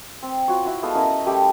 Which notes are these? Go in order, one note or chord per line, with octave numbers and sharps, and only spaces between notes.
C4
F4 F#4 C#5
E4 F#4 F#5
G#3 B3 A4 F5
C#4 E4 A#4 D#5
G3 A3 C#4 G4